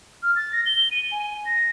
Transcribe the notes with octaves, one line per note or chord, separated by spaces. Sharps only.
F6
A6
A#6
G7
D#7
G#5
A#6